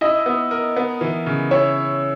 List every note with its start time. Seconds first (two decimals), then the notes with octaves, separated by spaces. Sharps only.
0.01 E4 D#5
0.26 B3
0.51 A#4
0.77 B3
1.01 E3
1.26 C#3
1.51 E4 C#5